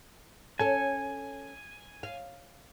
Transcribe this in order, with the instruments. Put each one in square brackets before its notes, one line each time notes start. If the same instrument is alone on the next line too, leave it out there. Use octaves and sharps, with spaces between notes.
[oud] C#4 A4 [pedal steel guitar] G#5
[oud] F5